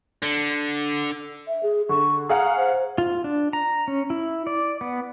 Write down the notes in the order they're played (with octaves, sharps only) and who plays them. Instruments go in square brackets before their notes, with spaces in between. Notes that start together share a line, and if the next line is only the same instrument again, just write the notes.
[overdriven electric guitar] D3
[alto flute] E5
G#4
[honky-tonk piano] D3 [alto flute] C#6
[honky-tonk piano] G#4 F5 F#5 [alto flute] A#5
[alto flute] C5
[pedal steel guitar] F4
D4
A#5
C#4
E4
D5
B3